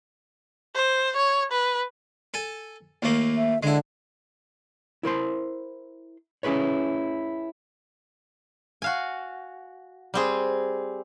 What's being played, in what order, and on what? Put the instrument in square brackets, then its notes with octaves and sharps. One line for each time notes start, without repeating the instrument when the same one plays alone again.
[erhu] C5
C#5
B4
[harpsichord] A4 G#5
D#2 A3 A#3
[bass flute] E5
[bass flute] D3 [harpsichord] G#3 E4
[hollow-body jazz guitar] E4 A#4 C5 C6
C#4 E4 G#4 B4 C#5
[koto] F#4 F5 G#5
G3 C4 G#4